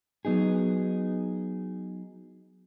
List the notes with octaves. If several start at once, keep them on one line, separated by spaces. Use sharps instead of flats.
F#3 B3 D#4 G#4